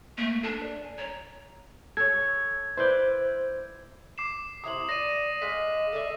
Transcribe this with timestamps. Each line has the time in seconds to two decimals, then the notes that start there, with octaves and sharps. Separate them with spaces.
0.18 A3 A#3
0.43 D4 A4
0.62 D5
0.82 G#5
0.98 C#5 A#5
1.97 A4 C#5 G#6
2.77 E4 B4 C5 D5 G6
4.18 D6 C7 E7
4.64 C3 E4 A#5 D#6 F#7
4.89 D5 A#6 D#7
5.42 G#3 D#5 F5 B6
5.93 A4 D5 E5